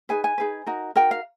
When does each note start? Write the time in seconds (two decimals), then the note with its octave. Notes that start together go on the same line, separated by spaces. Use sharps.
0.09 D#4 G#4 B4 G#5
0.24 G#5
0.38 D#4 G#4 B4
0.67 D#4 F#4 A#4
0.96 D#4 F#4 A#4 G5
1.11 F5